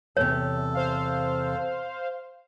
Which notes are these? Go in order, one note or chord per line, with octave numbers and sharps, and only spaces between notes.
E2 C3 A4 C#5
C5 F5